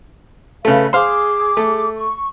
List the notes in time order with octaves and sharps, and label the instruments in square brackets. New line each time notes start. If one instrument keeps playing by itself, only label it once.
[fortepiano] C#3 A3 [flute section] B4 F5
[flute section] G#4 D6 [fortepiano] C5 F5
[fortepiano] A3
[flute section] C#6